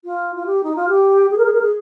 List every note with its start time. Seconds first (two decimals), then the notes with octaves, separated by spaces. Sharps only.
0.04 F4
0.36 F4
0.46 G4
0.63 D#4
0.75 F4
0.88 G4
1.30 G#4
1.38 A#4
1.45 G#4
1.53 A#4
1.62 G#4